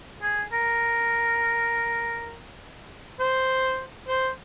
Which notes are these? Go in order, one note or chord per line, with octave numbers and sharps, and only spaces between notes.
G#4
A#4
C5
C5